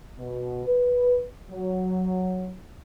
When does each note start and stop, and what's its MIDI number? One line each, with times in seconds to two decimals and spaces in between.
0.19 0.65 47
0.66 1.26 71
1.51 2.56 54